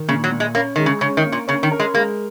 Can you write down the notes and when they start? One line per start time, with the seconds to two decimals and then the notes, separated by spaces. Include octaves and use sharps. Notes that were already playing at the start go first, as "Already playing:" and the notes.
Already playing: D#3
0.08 A#2 C#3
0.24 F#3
0.31 A#2
0.40 G#3
0.55 A#3 C#4
0.76 D#3 G#3
0.86 C#3
1.01 C#3 C#4
1.17 D#3
1.25 A#3
1.32 A#2
1.48 C#3 C#4
1.63 D#3
1.72 A#4
1.80 G#3
1.94 G#3 A#3